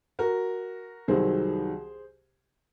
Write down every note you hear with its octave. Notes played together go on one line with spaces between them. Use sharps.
F#4 A#4
C2 C3 D#3 F#3 G#4 C5